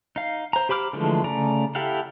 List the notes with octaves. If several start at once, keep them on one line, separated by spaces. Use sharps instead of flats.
D#4 F5
C5 A#5
G4 C5 B5 D6 F6
D3 E3 F3 G#3 A3
C#3 A3 D5 A#5
E4 G4 A4 F5 F#5